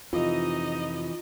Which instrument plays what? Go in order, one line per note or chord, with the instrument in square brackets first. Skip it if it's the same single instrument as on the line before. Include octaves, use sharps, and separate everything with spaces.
[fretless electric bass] F2 C3 [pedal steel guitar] E3 [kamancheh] D#4 D#5 [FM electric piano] F4